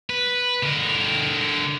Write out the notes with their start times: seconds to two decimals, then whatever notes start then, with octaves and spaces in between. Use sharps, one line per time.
0.10 B4
0.63 D3 A#4